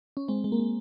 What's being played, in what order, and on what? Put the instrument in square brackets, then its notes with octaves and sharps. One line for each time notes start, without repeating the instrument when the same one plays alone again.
[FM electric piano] C#4
G#3 C4
G#3
A#3
G#3